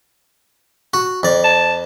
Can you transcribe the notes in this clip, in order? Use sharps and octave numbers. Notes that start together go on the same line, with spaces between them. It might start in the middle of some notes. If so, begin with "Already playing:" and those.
F#4
F2 D5
A5